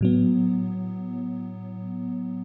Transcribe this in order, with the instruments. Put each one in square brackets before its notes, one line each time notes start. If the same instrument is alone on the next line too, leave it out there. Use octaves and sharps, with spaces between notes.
[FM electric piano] A2 F#3 B3